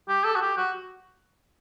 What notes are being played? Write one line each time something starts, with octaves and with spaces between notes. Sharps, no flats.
G4
A4
F#4
G4
F#4